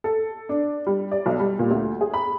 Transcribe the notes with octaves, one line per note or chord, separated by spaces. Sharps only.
A4
D4
G3
D5
B1
G3
A#2
D2
G#4
B5